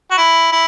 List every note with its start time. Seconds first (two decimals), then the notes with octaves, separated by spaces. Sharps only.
0.11 F#4
0.18 E4
0.52 E4